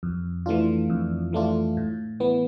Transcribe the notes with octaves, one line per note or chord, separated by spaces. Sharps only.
F2
E3 A3 D4 F4
F2
E3 A3 D4 F4
A2
E3 B3